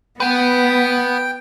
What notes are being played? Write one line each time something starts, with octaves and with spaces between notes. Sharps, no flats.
B3 B4 F#5 G5